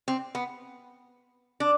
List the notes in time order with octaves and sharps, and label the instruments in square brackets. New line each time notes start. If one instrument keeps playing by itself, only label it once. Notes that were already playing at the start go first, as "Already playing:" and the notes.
[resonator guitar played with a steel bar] C4
B3
D4